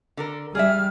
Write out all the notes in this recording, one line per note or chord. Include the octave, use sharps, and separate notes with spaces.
D3 A4 A#4
G3 G#4 D5 E5 F6